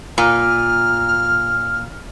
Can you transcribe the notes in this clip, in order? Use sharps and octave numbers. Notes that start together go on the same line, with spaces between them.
A#2 F6